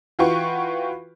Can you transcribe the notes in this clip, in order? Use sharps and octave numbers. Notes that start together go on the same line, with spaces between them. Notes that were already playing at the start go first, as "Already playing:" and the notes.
E3 F4 F#4 B4 G5 C#6